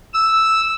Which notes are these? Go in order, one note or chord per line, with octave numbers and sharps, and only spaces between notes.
E6